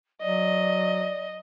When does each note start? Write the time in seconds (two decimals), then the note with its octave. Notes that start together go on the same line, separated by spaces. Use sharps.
0.22 F#3 D5 D#5